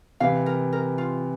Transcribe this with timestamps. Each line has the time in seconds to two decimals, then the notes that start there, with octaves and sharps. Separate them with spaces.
0.20 C3 E3 F5
0.46 A#4
0.73 A#4
0.98 F4